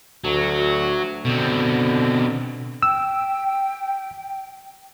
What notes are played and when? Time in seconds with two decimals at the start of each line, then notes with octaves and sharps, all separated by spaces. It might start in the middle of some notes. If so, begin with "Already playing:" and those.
0.24 D2 F#3
1.25 B2 D3 C4
2.83 G5 E6